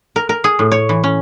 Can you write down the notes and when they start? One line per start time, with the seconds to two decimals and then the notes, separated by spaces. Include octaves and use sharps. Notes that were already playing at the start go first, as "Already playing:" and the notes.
0.16 A#4
0.29 A#4
0.44 G#4
0.59 A2
0.72 C#5
0.89 E3
1.04 C#4